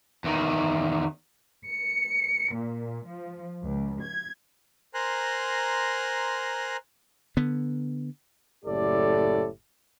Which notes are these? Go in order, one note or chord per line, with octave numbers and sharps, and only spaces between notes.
E2 D#3
C#7
A#2
F3
C#2
G#6
A#4 C5 G#5 A#5 C6 F#6
D3 B3
F#1 A2 G4 A4 D5